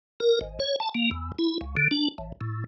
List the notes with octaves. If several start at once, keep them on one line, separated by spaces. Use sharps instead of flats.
A#4
G#1
C#5
A5
A#3
E2
E4
C#2
D3
D4
A1
A2